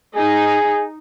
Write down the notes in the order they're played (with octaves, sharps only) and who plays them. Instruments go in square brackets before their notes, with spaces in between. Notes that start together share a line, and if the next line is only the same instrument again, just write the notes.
[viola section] D#4 [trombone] G#4